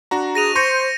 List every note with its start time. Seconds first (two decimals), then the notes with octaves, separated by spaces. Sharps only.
0.11 D4 F#4 A#5
0.35 G#4 A#6 D#7 F7
0.56 C5 C6 C#6 G6 A#6 C#7 D#7